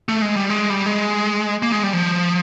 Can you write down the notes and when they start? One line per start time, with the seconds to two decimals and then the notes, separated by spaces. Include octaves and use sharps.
0.09 A3
0.22 G#3
0.36 G3
0.50 G#3
0.70 G3
0.86 G#3
1.63 A#3
1.72 G#3
1.83 G3
1.93 F3